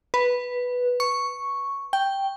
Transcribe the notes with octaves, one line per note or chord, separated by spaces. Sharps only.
B4
C#6
G5